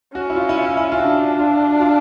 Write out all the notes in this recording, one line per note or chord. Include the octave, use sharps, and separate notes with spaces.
C#4 F#4
E4
F4
E4
F4
E4
F4
D4 F#4
F4
F4